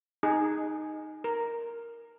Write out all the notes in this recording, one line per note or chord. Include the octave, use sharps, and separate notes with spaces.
D#4 G#4
A#4